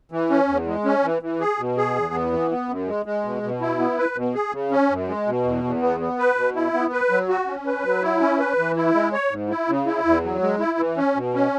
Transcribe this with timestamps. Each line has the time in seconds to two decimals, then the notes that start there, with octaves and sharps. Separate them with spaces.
0.12 E3
0.30 C#4
0.48 E2
0.67 G#3
0.85 C#4
1.04 E3
1.22 E3
1.40 G#4
1.59 B2
1.77 G#4
1.96 E2
2.14 B3
2.33 E3
2.51 B3
2.69 F#2
2.87 G#3
3.06 G#3
3.24 B2
3.43 B2
3.61 E4
3.80 B3
3.98 B4
4.17 B2
4.34 G#4
4.53 C#3
4.71 C#4
4.90 F#2
5.08 G#3
5.27 B2
5.45 E2
5.64 E2
5.82 B3
6.00 B3
6.19 B4
6.37 B2
6.55 E4
6.74 B3
6.92 B4
7.10 F#3
7.29 F#4
7.47 C#4
7.66 B4
7.85 F#3
8.03 E4
8.21 C#4
8.39 B4
8.58 E3
8.77 E4
8.94 G#3
9.13 C#5
9.31 G#2
9.49 E4
9.68 C#3
9.86 E4
10.05 E2
10.23 F#3
10.42 G#3
10.60 E4
10.78 E3
10.97 C#4
11.15 B2
11.34 C#4